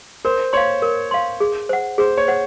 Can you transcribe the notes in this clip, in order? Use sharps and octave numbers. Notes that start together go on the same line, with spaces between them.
A#4 C5
C#5 F5 C6
A#4
F5 C6
G#4
C5 F#5
G#4 C5
C#5
C5 F#5